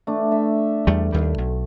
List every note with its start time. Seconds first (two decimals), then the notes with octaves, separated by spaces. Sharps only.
0.07 A3 D4
0.32 E5
0.87 E2 G3 A3
1.12 D#2 G3
1.38 B1